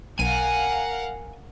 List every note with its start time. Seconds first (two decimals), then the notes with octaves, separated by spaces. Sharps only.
0.19 B1 A#4 F5 F#5 G#5 D#7